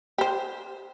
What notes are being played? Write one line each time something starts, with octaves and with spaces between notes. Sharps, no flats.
G4 C5